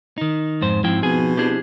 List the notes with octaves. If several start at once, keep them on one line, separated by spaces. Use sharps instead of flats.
D#3 D#4
F2 G#2 C5
G#2 F3 C4 D#4 E4 G5
B2 G#4 G#5
C4 D4 E4 G4 G#4